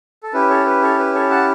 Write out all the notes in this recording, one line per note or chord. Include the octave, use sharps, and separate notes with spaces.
A4
C#4 E4 G4 B4
A4 C#5
B4
A4 C#5
B4
A4 C#5
F#5 A5